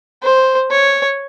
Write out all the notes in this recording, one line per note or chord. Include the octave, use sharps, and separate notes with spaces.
C5
C#5